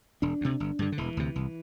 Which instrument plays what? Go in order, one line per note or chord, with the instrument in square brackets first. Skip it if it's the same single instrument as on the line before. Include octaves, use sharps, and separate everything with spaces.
[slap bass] E1 D4
D2 C3
G1
G2 D3
D3
E1 E3
D2 C3
C2